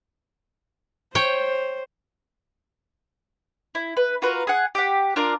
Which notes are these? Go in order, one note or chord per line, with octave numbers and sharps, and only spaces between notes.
C5 C#5 G5
E4
B4
F4 F#4 A#4 B4
G#4 F#5
G4 F#5
D4 F4 A#4 D5